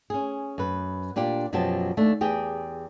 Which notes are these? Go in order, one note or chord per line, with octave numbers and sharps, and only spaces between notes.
C#4 G#4
F#2 B4
A#2 D4 F4 G4
F#2 B2 F3 F#3 G4 A5
D#2 A3 D4
E2 G4 G#4 G5